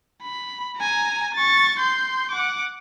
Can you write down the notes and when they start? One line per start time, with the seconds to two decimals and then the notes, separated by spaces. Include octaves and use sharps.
0.22 B5
0.77 G#5 A#5
1.34 C#6 A6
1.79 C6 G6
2.31 F#5 D6